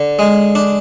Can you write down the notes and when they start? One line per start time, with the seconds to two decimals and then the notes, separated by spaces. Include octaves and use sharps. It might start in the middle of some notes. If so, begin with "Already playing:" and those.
Already playing: D3
0.19 G#3
0.55 D4